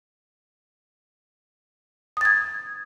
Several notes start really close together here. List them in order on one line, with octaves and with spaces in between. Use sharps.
D#6 A6 G#6